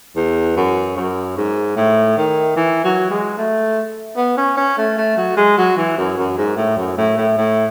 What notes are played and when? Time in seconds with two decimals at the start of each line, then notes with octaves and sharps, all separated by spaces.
0.16 E2
0.56 F#2
0.97 F#2
1.37 G#2
1.76 A2
2.17 D#3
2.56 E3
2.84 F#3
3.10 G#3
3.37 A3
4.17 B3
4.37 C#4
4.57 C#4
4.78 A3
4.98 A3
5.17 F#3
5.37 G#3
5.58 F#3
5.77 E3
5.97 F#2
6.18 F#2
6.37 G#2
6.57 A2
6.78 F#2
6.97 A2
7.18 A2
7.37 A2